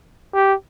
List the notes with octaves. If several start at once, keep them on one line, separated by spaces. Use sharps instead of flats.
G4